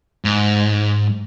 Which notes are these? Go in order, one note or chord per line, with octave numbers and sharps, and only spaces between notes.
G#2